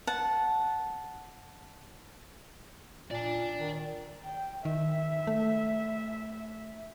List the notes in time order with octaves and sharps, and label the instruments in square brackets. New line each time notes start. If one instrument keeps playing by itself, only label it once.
[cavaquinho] F#5 A5
[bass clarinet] A#2 [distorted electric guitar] D5 A5
[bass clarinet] D#3
[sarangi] G5
[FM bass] D#3 [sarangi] E5
[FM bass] A3